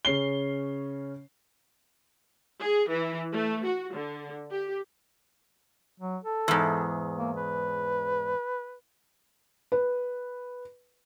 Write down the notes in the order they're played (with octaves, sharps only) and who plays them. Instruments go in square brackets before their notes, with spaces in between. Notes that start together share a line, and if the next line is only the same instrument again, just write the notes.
[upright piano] C#3 C#4 C7 G7
[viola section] G#4
E3
A3
F#4
D3
G4
[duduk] F#3
A4
[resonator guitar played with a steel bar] E2 G#2
[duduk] A#3
B4
[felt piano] B4